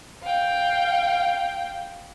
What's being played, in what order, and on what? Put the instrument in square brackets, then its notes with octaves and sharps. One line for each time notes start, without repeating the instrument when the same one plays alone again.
[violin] F5 G5